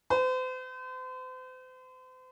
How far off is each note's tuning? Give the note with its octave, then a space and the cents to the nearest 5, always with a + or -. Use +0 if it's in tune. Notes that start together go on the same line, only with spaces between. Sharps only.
C5 -40